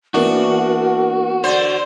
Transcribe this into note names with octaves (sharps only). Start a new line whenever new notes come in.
E3 A#3 B3 D4 F#4 A#4
D3 C5 D5